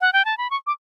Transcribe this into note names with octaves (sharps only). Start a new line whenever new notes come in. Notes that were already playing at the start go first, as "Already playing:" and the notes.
F#5
G5
A5
B5
C#6
D6